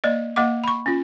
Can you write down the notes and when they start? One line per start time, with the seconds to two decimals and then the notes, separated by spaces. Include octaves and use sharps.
0.04 A#3 D5 D#5
0.36 A#3 D#5 F#5 D6
0.64 B5 C#6
0.86 C#4 F4